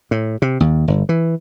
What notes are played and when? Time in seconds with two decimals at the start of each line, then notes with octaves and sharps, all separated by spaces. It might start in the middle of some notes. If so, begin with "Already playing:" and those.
0.11 A2
0.42 C3
0.60 D#2
0.88 G1
1.09 E3